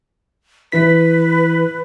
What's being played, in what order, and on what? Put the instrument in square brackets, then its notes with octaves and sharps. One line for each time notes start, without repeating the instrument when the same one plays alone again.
[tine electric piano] E3 E4 B6 [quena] B4